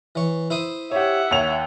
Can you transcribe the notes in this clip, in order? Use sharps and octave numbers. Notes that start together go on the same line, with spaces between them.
E3 C#5
E4 C5 D#6
G4 C#5 E5 F#5
D#2 C#5 F7